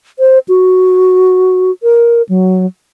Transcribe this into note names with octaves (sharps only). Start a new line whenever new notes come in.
C5
F#4
A#4
F#3